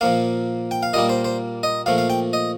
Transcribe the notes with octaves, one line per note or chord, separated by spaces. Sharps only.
A#2 F3 A#3 F5
G5
F5
A#2 G3 A#3 D#5
C5
C5
D#5
A#2 F3 A3 F5
F5
G5
D#5